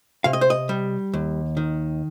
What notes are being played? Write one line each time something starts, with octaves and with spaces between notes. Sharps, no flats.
C3 F5
D#5
C5
D#5
G3
D#2
D#3